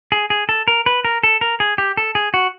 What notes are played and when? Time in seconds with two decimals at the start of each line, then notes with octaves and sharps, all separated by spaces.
0.12 G#4
0.30 G#4
0.49 A4
0.68 A#4
0.86 B4
1.05 A#4
1.23 A4
1.41 A#4
1.60 G#4
1.78 G4
1.97 A4
2.15 G#4
2.34 F#4